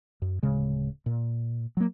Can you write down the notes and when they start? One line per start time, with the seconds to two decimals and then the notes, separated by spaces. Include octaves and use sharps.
0.22 F#2
0.43 D1 C#3 G#3
1.06 A#2
1.77 F#3 A#3